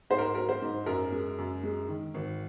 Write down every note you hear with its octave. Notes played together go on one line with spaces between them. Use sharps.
G#2 C5
A#4
F#3 A#4
C5
G#2
F#2 A#4
G#3
F#2
G#3
D#3
G#1